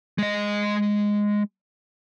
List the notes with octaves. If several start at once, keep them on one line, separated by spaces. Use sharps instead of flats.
G#3 D#5